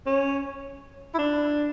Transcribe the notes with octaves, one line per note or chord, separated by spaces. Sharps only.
C#4
E4
D4